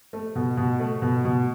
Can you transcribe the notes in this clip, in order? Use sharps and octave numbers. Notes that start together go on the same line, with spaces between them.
A3
B2
B2
A3
B2
B2